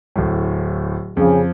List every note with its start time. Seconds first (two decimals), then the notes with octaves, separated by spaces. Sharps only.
0.16 D1 A2
1.17 F2 C#3 F3